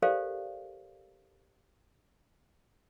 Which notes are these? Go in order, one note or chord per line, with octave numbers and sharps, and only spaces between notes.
G4 A4 A#4 C5 D5 F5